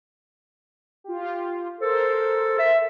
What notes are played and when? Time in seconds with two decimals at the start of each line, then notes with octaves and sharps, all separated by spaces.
1.04 F4 G4
1.80 A4 A#4 C5
2.59 E5